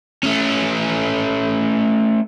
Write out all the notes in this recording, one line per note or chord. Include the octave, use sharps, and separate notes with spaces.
A3 C#4